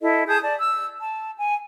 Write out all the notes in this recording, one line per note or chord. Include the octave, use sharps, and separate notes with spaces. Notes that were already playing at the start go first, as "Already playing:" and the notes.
E4 A4 D#5
G#4 A5 D#6 G6
D5 A5
E6
A5
G#5